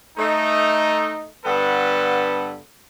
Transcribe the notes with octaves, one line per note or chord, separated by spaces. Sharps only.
A3 D#4
G2 D3 B3 A4 B4